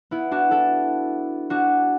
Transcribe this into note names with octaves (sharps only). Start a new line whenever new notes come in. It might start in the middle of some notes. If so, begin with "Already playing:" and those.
B3 E4
D4 F#4
E4 A4
D4 F#4